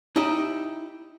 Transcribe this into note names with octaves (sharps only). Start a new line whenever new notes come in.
D#4 E4 G4 D#5 E5